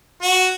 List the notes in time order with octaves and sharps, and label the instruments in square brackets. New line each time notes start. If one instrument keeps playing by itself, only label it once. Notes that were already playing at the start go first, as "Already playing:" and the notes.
[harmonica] F#4